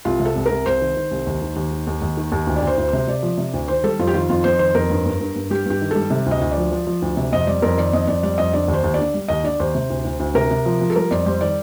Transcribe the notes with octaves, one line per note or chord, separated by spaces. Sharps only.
C2 F4
C3
A4
C2
A#4
C2
C2 C5
D#3
D#3
C2
D#2
D#3
D#2
D#3
D#2
D#2
D#3
D#2
D2
D5
D2 C5
D2
C3 C5
C3 D5
F3
C3
D2
D#3 C5
G3 A4
F2 F4
G4
D#3 F4
F2 F4
F2 C5
D#3 C5
F2 A#4
G2
G2
G2
G2
G3 G4
G2 G4
D#3
G3 A4
C3
D2
D#5
D2
D5
F3
F3
F3
D2
C3
F2 D#5
G3 D5
F2 A#4
D#3 D5
F2 D#5
F2 D5
G3 D5
F2 D#5
D3 D5
D#2
C5
D#2
D3 D5
G3
D#2 D#5
D3 D5
D#2 C5
C3
D2
D2
D2
C3 A#4
C3
F3
F3
A4
G3 A#4
F2 D5
G3 C5
D#3 D5